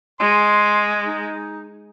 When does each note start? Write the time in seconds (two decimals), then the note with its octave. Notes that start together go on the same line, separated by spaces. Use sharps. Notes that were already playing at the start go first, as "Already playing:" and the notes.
0.20 G#3 C6
1.06 D#4